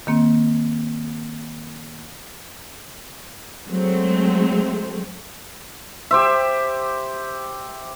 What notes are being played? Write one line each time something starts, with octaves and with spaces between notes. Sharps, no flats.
D#3 A#3 C4
F#3 G#3 A3 C4
G4 C5 E5